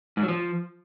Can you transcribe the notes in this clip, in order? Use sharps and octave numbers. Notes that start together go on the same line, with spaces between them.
G#2
F#3
F3